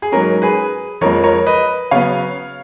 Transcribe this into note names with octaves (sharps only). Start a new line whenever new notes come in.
G#4
G#2 F#3 C#4 A#4
G#4 B4
F2 F3 G#3 A#4 C#5
A#4 C#5
B4 D#5
C#3 F#3 B3 C#5 F5